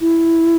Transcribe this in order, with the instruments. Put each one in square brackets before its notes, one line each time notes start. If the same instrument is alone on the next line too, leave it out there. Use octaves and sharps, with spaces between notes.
[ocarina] E4